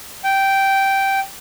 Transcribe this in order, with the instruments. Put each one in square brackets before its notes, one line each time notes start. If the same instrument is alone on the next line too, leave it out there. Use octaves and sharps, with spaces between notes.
[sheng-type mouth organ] G5